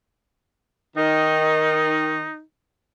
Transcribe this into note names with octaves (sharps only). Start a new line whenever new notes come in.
D#3 D#4